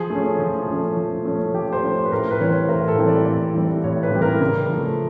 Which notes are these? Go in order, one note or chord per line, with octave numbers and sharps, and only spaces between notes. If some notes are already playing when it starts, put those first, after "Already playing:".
Already playing: F3 G#4
A3 C#4
F3
A3 C#4
F3
A3 C#4
F3 G4
C5
A3 C#4
B4
A2 A#4
B4
E3 G3 C4 C#5
C5
A2 A#4
A4
E3 G3 C4
D5
A2 D5
E3 G3 C4
A2 C#5
B4
E3 G3 C4
A#4
C#3
F3 A3